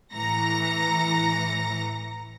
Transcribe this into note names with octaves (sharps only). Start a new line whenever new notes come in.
A2 E3 A#5 A#6 C#7